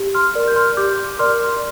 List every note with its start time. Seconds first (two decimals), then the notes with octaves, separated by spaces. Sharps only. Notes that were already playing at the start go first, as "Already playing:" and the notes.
Already playing: G4
0.15 C6 F6
0.35 A#4 D5
0.48 G6
0.56 C6 F6
0.77 G4 D6 G6
1.19 A#4 D5 C6 F6